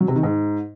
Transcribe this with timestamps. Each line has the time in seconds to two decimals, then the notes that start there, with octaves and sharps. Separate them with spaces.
0.01 F#3
0.08 C3
0.16 D#3
0.23 G#2